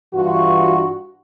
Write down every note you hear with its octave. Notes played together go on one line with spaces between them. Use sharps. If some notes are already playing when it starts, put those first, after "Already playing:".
G2 E3 F4 F#4